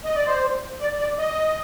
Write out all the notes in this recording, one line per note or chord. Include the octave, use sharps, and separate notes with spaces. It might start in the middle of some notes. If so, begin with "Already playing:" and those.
D#5
D5
C5
D5
D5
D#5